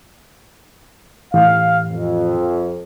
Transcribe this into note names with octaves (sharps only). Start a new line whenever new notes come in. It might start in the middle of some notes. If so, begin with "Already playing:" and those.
A2 E3 G4 F5
F2